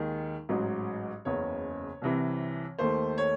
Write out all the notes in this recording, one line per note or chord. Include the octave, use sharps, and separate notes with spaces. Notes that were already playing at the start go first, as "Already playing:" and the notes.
Already playing: D#2 D#3 G#3
A1 G#2 F#3
F#1 E2 C#3 C#5
C2 C3 E3
D#2 D#3 A3 C5
C#5